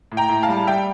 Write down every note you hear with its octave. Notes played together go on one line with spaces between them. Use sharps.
A2
G5 A#5
A2
F5 A5
G3
G3 E5 G5